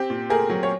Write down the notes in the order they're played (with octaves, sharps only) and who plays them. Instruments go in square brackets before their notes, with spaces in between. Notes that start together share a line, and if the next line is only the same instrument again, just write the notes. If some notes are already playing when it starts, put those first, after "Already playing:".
Already playing: [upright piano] C4 G4
A#2
A3 G#4 A#4
F#3
C#5